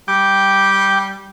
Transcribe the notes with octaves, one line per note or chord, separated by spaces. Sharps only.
G3 G5 D6